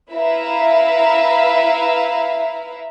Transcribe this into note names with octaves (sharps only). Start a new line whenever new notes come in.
E4 B4 E5 F5 A#5